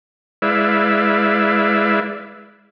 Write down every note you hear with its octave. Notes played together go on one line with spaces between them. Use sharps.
G#3 E4 B4 D5 E5 F5